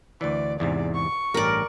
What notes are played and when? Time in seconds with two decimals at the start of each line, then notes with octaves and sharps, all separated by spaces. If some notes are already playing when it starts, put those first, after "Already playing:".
0.21 D2 E3 D5
0.60 E2 G#2 C3 D5
0.95 C#6
1.34 A1 G2 A#4 D5